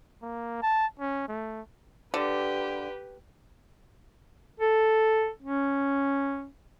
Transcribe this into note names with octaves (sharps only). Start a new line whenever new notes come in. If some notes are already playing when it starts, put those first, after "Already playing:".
A#3
A5
C#4
A3
D3 G4 B4
A4
C#4